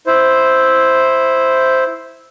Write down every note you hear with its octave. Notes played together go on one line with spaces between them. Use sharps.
E4 C5